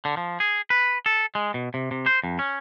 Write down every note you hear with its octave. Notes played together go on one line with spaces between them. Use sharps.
D3
F3
G#4
B4
A4
G#3
B2
C3
C3
C5
F2
C#4